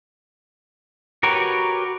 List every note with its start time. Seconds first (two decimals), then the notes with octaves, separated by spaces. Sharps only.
1.23 F#4 G4 A#4 B4 C#5